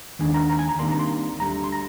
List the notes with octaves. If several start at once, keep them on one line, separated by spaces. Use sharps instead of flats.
D#2 D#3 G#3 D4 G#5
A#5
A#5
G#5
A#5
C2 C3 D#3 A#3 D4 C6
A#5
C6
D2 D3 G3 A#5
C6
A#5